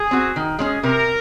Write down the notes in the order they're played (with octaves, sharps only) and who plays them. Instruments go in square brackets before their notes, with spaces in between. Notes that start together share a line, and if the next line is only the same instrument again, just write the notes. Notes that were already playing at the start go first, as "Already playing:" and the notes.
Already playing: [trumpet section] G#4
[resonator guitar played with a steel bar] C4 F#4
D#3
G#3 C#4 G#4
[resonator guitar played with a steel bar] C3 [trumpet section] A#4